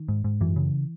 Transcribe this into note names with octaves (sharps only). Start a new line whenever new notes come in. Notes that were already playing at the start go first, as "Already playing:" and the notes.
Already playing: D#3
G#2
G#2
F#2 E3
C#3